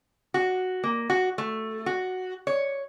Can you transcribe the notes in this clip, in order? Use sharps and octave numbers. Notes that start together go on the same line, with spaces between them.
F#4
A#3
F#4
A3
F#4
C#5